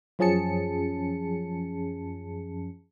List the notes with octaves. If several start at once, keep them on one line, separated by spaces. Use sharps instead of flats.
F#2 F3 C#4 G#4 A5 C#7